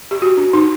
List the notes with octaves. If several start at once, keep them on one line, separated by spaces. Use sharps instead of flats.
G4
F#4
D4
D#4